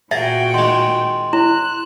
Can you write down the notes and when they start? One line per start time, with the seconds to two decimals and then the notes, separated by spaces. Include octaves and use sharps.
0.11 A#2 F#4 G#4 A#4 E5 G5 A6
0.54 D#3 G#3 C6
1.33 E4 F#6 E7